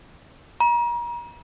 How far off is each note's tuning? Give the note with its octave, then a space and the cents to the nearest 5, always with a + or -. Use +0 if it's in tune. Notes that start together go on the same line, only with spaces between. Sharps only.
A#5 +35